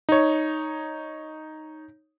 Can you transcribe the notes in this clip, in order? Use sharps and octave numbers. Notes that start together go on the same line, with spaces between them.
D#4 C#5